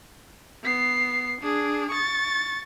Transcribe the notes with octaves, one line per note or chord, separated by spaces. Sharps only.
B3 C7
D4 G#4
C#6 A6